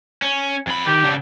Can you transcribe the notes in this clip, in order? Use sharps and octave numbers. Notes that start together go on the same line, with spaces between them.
C#4
F2 B5
D#3 G4
C#3 D4